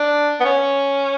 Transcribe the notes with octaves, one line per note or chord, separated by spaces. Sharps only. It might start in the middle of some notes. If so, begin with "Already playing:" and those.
Already playing: D4
B3
C#4